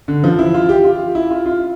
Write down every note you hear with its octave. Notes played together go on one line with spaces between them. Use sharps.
D3
F3
E4
F4
G4
F4
E4
F4
F4